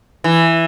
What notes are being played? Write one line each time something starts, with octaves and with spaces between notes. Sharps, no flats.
E3